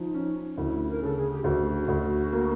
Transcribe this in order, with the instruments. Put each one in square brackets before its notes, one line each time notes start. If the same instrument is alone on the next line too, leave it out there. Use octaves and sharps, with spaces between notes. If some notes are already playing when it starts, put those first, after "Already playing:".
Already playing: [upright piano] F3 [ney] D#4
[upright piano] C#4
[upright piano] D2 [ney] E4
[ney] A#4
[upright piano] C#3 [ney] A4
[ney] G#4
G4
[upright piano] D2 [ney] F#4
[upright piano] D2
A#3